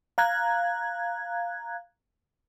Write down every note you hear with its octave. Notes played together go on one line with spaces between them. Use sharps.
F5 A#5 F#6 G#6